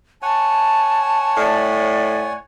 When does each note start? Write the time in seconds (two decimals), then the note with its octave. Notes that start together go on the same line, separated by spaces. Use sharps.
0.22 C#5 F#5 G#5 A5
1.37 A2 D5